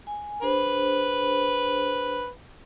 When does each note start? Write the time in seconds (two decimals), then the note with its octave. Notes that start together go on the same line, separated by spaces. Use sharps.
0.07 G#5
0.42 D4 G#4 B4 C5